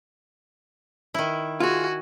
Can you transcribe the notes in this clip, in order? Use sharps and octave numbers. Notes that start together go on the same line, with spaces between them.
D#3 E4
F4 F#4 G#4 G#5